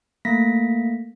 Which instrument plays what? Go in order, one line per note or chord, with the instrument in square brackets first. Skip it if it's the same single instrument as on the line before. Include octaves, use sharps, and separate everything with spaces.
[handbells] A3 A#3 A#6 B6